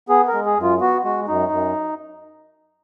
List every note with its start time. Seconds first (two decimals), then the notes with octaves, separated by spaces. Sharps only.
0.09 B3 G#4
0.28 A#4
0.33 G#3
0.46 G#4
0.57 F#2 F4
0.80 B3 F#4
1.04 G#3 F#4
1.28 F#2 D#4
1.52 F#2